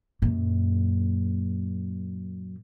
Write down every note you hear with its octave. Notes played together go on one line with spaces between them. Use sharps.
F#2 A#2